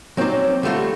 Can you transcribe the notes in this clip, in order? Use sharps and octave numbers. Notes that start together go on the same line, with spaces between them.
F#3 C4 C#4 D#4 C5 D5
D3 G3 A3 F4 F#4